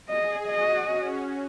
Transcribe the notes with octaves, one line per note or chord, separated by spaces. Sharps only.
G#4 D#5
F#4 D#5
C#4